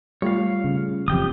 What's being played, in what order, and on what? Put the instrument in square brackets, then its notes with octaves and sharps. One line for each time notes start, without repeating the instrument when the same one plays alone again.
[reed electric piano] G3 A3 F4 [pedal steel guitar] C#5 F5
[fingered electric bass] C#3
[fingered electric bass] E1 F2 [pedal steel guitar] G4 G5 D#6